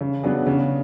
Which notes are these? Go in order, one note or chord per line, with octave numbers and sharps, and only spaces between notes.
C#3
F#3 B3 D4 G#4
C#3